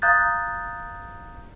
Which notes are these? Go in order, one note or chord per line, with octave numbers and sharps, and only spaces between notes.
F5 A#5 D#6 F#6 G6 A6